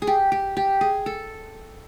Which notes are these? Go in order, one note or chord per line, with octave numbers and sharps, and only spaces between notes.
G#4
G4
G4
G4
G#4
A4